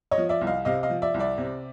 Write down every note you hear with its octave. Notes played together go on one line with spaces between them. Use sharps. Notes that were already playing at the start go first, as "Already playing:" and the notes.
C#5 D#5
F3
D5 E5
C2
D#5 F5
C3 D#5 F5
D#5 F5
F3
D5 E5
C2
D5 E5
C3